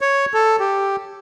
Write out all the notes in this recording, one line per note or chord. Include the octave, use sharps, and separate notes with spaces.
C#5
A4
G4